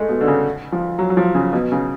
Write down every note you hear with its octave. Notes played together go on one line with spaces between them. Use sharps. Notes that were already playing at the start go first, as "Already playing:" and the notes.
Already playing: G#3 A3
B2
D3
C#3
F3
F#3
F#3
F3
C#3
B2
C#3